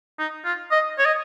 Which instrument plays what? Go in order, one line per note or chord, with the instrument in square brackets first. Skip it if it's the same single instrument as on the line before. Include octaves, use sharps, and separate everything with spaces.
[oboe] D#4
F4
D#5
C#5
D#5